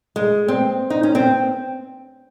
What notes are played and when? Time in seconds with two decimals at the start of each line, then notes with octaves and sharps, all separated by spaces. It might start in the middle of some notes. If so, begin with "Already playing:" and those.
0.16 G#3
0.48 C4
0.90 D#4
1.03 C#4
1.15 C4